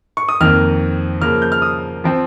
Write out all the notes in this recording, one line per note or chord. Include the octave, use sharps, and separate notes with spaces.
C#6
D#6
F2 D#3 A#3 F6
C#3 F3 A#3 F6
G6
F6
D#6
F3 C4